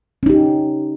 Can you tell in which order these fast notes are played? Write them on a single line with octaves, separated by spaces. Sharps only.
C#4 D#4 G4